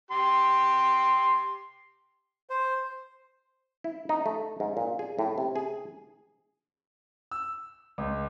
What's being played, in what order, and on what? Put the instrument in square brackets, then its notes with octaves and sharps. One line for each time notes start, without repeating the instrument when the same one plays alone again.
[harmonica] G4 C6
[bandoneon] C5
[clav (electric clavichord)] E4
D#4
A3
G#2
A#2
G#4
A2
C3
G#4
[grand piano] E6
C#2